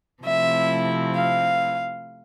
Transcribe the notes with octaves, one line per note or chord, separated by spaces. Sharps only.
C3 F3 A3 C4 E4 E5
F5